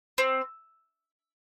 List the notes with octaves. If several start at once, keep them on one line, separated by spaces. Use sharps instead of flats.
C4